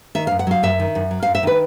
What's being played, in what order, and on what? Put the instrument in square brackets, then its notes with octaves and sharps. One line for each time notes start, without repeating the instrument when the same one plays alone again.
[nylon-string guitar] D#3 E5
F#2 F5
F#5
F#3 F5
F#2 E5
D#3
F#2
F#3
F#2 F5
E5
D#3 B4